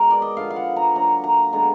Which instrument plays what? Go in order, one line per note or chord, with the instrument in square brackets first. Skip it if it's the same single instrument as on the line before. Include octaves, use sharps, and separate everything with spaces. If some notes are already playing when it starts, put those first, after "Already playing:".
Already playing: [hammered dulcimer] B2 G#3 B3 A#4
D5
D#5
D3 F3 B3 F5
F5
F#5
A#5
D3 F#3 A#3 A#5
A#5
D3 G#3 B3 A#5